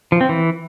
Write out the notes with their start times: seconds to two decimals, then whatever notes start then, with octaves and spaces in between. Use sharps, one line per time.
0.12 F3
0.21 C4
0.29 E3